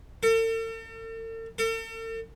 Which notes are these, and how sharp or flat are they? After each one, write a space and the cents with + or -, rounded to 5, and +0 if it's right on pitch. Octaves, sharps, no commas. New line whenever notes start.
A4 +45
A4 +45